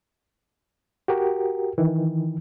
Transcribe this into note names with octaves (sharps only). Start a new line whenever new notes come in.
F#4 G4 A#4
D#3 E3